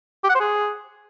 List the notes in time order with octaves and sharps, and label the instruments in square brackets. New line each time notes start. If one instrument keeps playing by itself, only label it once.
[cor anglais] G4
F#5
C5
G#4